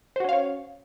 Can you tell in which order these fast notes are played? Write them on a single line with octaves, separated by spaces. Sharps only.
C5 F#4 C#4 F5 C#5